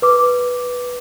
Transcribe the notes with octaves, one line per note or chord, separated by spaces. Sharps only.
B4 D6